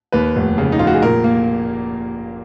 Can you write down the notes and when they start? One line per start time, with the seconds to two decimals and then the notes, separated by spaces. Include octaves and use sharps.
0.12 D#2 B4
0.36 F1
0.58 C#3
0.72 D#4
0.79 F1 F4
0.87 F#4
0.94 G#4
1.02 A#2 A#4
1.24 A#3